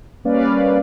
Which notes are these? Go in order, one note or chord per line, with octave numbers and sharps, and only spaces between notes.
G3 A#3 C#4 B4 D5 F5